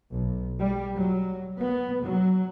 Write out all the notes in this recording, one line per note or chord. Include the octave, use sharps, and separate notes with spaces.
B1
G3
F#3
B3
F#3